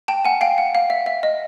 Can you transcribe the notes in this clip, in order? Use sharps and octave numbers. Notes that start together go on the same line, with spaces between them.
G5 A5
F#5 G#5
F5 G5
F#5
F5
E5
E5
D#5